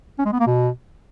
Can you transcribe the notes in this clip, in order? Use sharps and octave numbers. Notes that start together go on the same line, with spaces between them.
C#4
G#3
B3
A#3
B2